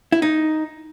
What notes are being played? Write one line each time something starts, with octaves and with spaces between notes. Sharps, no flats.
E4
D#4